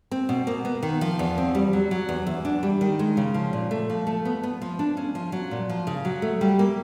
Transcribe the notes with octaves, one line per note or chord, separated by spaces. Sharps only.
C4
B2
A#3
B3
D#3
F3
E2
C4
G3
F#3
F#3
E2
E2
D4
G3
D#3
G#3
C#3
F3
A#2
A3
F3
A3
B3
B3
F3
D4
C#4
F3
F#3
A#2
F3
C#3
F#3
A3
G3
A#3